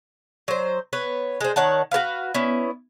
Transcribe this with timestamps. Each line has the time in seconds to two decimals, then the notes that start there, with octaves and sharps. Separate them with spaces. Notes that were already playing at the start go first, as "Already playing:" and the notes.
0.48 F#3 C5
0.93 B3 B4 C#5
1.41 G#3 C5
1.56 D#3 C#5 F#5 A5
1.91 F#4 A4 B4 F5
2.34 B3 C#4 E4